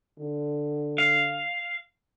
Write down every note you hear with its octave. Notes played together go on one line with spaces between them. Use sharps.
D3
F5